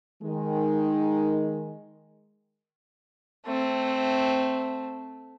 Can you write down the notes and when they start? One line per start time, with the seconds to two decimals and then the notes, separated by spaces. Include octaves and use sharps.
0.22 D#3 G#3
3.46 A3 C4